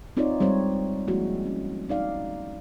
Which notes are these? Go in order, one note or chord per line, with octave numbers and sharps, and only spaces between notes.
C4 D#4 F4 C#5 D5
G3 G#3 C4 C5 C#5
F3 G#3 A#3 E4 F#4
C#4
C4 D#4 D5 F5